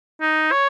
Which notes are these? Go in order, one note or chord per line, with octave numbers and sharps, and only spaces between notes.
D#4
C#5